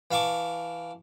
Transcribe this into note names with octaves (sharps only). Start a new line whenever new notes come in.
E3 F5 A5 C#6 D6